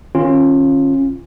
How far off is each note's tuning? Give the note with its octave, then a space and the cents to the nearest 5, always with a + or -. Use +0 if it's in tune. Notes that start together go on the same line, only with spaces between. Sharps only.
D#3 +0 C#4 -30 F4 +0